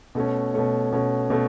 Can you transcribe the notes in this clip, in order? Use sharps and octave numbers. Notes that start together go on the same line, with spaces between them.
B2 A3 C#4
B2 A3 C#4
B2 A3 C#4
B2 A3 C#4